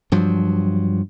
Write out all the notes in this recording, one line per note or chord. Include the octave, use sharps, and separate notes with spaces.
G2 F3 F#3